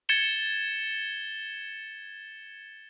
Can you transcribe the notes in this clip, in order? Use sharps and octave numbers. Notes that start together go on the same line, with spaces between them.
G#6 A6 C#7 E7 G7